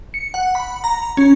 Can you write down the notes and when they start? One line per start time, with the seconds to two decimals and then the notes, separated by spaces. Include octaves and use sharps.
0.14 C#7
0.34 F#5
0.55 B5
0.84 A#5
1.17 C#4